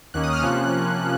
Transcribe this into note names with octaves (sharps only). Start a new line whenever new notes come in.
D#2 D#3 A#3 C#4 F#6
D#6
F6
C3 F3 A#3 C#4 F#6